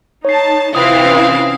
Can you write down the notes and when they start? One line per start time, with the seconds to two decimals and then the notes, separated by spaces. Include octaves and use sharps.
0.25 D#4 C#5 A5 C7
0.75 C3 E3 C4 E4 F4 F5 D#6
1.06 C#4 D#6